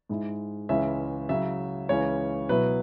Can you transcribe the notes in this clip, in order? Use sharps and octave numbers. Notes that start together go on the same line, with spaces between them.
G#2 G#3 E4
C#2 C#3 E3 G#3 C#4 E5
C#3 F#3 E4 E5
C#2 C#3 E3 C#4 C#5
B2 F#3 B3 E4 B4